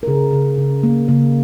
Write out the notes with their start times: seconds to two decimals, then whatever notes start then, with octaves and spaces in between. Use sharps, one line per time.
0.03 A#4
0.07 C#3 G#4
0.33 C#3
0.58 C#3
0.83 A#3
1.08 C#3 A#3